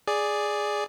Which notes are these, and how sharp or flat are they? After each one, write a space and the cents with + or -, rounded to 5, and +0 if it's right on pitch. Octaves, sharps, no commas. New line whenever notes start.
G#4 +0 D5 +0